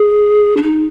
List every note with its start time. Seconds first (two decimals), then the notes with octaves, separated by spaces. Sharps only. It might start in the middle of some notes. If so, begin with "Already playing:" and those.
Already playing: G#4
0.57 D4
0.63 D#4